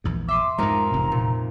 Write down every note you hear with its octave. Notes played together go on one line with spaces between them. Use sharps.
A#1 E2 G#2
E5 C6 D6 D#6
F2 G#2 G#3 D#4 A#4 A#5
E1 C3 C4
A#2